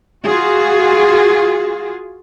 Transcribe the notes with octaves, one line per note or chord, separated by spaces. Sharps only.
F4 F#4 G#4